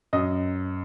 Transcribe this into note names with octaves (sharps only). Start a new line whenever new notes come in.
F#2 D#5